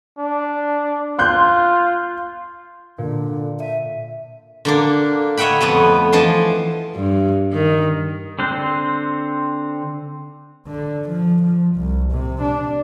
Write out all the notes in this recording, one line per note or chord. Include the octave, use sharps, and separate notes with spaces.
D4
F4 C6 F#6 G6
A#2 D3
E5 D#7
D3 A#3 D4
C#5 D#5 E5 F#5 G5 B5
F2 A3 B3 D#5
E3 F3 D#5 A5 C6
G2
D#3
D3 C4 C5 F#6
D3
F3
F3
C2
C3
D4